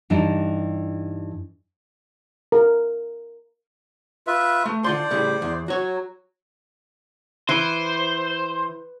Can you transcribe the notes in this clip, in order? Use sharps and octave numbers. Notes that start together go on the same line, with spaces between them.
G2 E3 D4 D#4
A#4
F4 B4 E5
A3
D3 F4 C5 D5 C6
A2 C#3 G3
E2
F#3 F#4 C#5
E3 C5